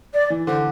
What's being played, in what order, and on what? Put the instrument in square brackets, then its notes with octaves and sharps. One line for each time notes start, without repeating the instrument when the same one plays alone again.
[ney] D5
[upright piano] E3
[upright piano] D3 [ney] C5